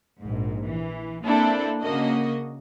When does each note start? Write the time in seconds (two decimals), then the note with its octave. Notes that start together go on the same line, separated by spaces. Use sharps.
0.22 A#1 G#2
0.66 E3
1.24 A#3 C4 D4 E4 A4
1.82 C#3 A#3 F#4 D#5